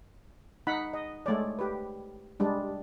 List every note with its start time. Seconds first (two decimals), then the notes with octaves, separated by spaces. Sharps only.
0.67 D#4 F#5 B5
0.93 D#5
1.26 G#3 A3 C#5 D5
1.59 G4 B4
2.40 G3 G#3 D4